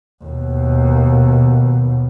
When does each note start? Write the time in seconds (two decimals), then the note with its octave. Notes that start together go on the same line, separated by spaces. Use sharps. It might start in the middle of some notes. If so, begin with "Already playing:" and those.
0.24 D#2 B2